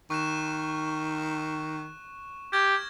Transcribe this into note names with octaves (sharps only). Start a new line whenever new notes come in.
D#3 C#6 F#6 E7
G4 F6 G#6 A#6